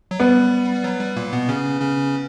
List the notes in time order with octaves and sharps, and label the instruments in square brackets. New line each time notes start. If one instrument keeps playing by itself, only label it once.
[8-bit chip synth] F#3
[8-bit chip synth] G3 [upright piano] B3
[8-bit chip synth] F#3
G3
A#2 A#3
B2 B3
C#3 C#4
C#3 C#4